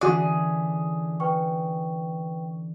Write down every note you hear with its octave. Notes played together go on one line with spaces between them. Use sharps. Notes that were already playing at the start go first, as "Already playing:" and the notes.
D3 E3 C#4 F#4 G#4 D5
B4 G5 C#6